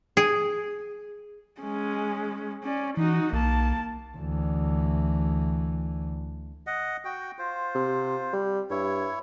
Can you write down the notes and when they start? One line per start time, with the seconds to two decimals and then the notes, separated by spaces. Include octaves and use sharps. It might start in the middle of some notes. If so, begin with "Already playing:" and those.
0.17 G#4
1.61 G#3 C#4
2.63 C#4 D5
2.97 E3 D#4 F#4
3.33 B1 A#3 A5
4.17 D2 E3
6.67 D#5 F#5
7.05 F#4 G5
7.39 F4 C5
7.75 C3
8.33 G3
8.71 G2 E4 C#5